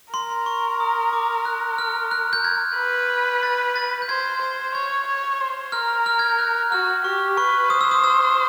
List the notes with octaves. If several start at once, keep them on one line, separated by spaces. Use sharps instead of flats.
A#4 C6
C#6
D#6
D6
F#6
F6
F#6
G6
G#6
B4
A6
A6
G6
C5 G#6
C5 G#6
C#5 G#6
C#5
C5
A#4 F6
F6
G#6
G6
F#6
F#4 F6
G4 C#6
B4 C#6
C5 D#6
E6
D#6
E6